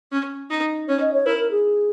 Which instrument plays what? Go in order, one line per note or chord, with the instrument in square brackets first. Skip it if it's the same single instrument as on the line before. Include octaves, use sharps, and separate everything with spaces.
[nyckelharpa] C#4
D#4
[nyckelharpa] C#4 [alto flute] C#5
[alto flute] D#5
C#5
[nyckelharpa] E4 [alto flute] A#4
[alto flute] A#4
G#4